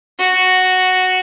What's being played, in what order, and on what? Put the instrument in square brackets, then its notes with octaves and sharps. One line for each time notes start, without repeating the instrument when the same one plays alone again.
[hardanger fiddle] F#4